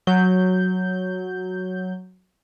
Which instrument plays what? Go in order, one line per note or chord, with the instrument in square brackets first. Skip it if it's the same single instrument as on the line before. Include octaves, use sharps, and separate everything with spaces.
[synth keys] F#3 G6